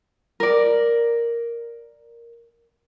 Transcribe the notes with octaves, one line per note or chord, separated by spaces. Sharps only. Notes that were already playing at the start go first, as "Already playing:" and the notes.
A#4 D5